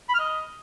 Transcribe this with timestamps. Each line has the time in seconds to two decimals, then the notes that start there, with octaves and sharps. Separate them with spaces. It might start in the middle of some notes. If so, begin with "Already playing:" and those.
0.09 B5
0.14 F6
0.19 D#5